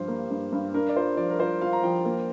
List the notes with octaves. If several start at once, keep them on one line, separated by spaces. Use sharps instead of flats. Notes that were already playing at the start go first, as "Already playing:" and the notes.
Already playing: G2 F3 G4 C5
A#3
G2
G2
D4 A#4
D5
F4 C5
F3 D5
A#4
F4 C5
F4 F5
A#5
F3 G5
A#3